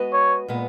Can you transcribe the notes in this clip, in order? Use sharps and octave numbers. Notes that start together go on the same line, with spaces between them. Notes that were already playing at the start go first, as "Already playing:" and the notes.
Already playing: G#3 B3 F#4 B4 D#5
C#5
A#2 G#3 B3